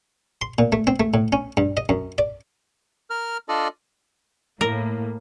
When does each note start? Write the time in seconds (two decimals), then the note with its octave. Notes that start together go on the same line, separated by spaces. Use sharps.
0.42 C6
0.59 A#2
0.72 A3
0.87 C4
1.00 A3
1.14 A2
1.33 C#4
1.57 G2
1.77 D#5
1.89 F#2
2.18 D5
3.10 A#4 F6
3.49 D4 F4 A4 D5 D#5
4.61 A2 A#3 A#4